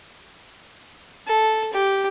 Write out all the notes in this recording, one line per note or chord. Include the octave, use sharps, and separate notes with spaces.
A4
G4